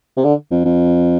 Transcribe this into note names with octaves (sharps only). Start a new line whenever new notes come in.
C3
D3
F2
F2